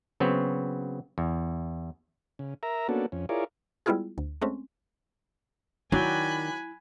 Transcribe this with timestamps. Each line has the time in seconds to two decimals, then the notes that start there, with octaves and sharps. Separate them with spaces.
0.20 C#3 F#3 B3 C4
1.18 E2
2.39 C#3
2.63 A#4 E5 A#5
2.89 A#3 B3 C#4 D4 F#4 A4
3.12 F2 C#4
3.29 E4 F4 G#4 A#4 C#5 D5
3.86 G3 G#3 B3 E4 F4 G#4
4.18 D2
4.42 G#3 A3 C4 C#4
5.92 D#3 F#3 E4 D5 G5 G#5 B5 F#6